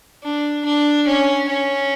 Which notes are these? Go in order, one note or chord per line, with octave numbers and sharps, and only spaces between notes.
D4
D4
C#4
C#4